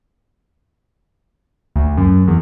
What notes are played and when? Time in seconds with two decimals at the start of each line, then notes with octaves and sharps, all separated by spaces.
1.76 D2
1.97 F#2
2.28 E2